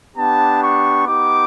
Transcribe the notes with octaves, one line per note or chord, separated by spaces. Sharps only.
B3 D4 G4 A5
C#6
B3 D#4 G4 D6